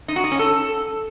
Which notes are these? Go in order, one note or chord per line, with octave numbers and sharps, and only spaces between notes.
D#4
F#4
D#4
C#4
A4